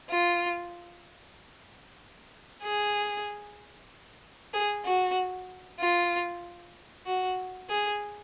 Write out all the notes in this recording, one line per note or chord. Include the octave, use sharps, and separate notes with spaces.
F4
G#4
G#4
F#4
F4
F#4
G#4